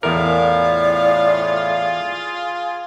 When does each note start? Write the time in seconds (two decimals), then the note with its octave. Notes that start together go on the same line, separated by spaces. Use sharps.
0.03 E2 A2 F4 G#4 A#4 D5 F5